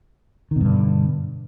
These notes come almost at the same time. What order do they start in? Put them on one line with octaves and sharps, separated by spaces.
D#3 B2 G2 D3